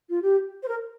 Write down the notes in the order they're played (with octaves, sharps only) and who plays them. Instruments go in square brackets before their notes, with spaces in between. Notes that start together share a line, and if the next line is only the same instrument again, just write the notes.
[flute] F4
G4
C5
A#4